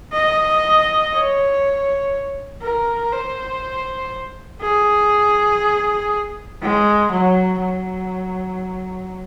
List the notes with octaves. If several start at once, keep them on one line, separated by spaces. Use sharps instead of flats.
D#5
C#5
A#4
C5
G#4
G#3
F#3
F#3